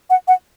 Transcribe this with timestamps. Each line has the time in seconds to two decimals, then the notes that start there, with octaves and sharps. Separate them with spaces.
0.10 F#5
0.28 F#5